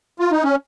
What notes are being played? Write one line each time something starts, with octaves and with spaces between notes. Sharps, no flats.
F4
D#4
C#4